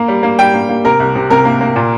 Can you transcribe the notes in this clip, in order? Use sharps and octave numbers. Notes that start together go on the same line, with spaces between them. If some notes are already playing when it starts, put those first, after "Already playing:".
Already playing: A#3 A#5
G3
A#3
G3 G5
A#3
A#3
C3 A#4
C2
C3
C3 A#4
A#3
A#3
A#2